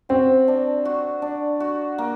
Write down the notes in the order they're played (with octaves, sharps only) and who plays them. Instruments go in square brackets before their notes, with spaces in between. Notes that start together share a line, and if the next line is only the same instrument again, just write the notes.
[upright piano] C4 [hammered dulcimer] F#4
[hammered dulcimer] D4
F#4
D4
F#4
A#3